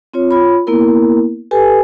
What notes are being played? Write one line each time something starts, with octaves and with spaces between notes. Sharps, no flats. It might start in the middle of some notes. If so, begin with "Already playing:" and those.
C4 F4 C#5
F4 C#5 B5
A#3 B3 E4 A#4
G4 A4 B4 G#5